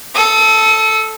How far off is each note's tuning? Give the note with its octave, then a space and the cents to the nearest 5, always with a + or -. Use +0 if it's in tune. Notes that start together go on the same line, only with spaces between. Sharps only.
A4 +0 D#6 +35